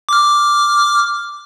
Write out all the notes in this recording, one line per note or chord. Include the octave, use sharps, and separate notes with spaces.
D6 F6